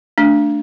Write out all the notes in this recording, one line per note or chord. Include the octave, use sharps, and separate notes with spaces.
A3 D4